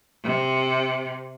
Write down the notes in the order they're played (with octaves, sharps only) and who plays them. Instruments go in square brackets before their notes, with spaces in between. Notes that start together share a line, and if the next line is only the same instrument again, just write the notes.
[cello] C3